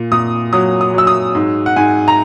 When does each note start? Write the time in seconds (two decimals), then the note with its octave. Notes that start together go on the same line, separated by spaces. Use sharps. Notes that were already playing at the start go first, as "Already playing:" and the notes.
Already playing: A#2
0.12 A#2 D#6
0.53 F#3 D#6
0.81 D#6
0.94 F#3 E6
1.07 D#6
1.35 G#2
1.66 F#5
1.76 G#2 G#5
2.08 A#5